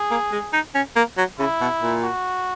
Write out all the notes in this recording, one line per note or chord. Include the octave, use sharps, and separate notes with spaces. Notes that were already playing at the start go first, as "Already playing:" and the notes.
Already playing: G#4
A#3
G#3
D#4
C#4
A#3
F#3
C#3 E4
B2
A#2
F#4